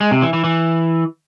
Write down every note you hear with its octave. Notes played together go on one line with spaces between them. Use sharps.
G#3
C3
E3
E3
E3